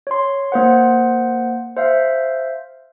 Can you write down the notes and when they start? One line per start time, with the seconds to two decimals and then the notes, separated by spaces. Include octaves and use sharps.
0.07 C#5 C6
0.52 A#3 C5 F#5
1.77 C5 E5 F5